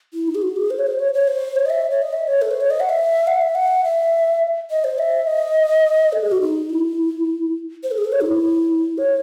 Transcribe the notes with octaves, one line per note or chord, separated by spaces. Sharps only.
E4
D#4
G#4
F#4
G#4
C5
C#5
C5
C#5
C#5
C5
C#5
D#5
E5
C#5
D#5
E5
C#5
A4
C5
C#5
D#5
F#5
E5
F#5
E5
F#5
E5
D#5
C5
E5
D#5
A4
G#4
F#4
D#4
E4
C5
A4
G#4
A4
C#5
D#4
E4
C#5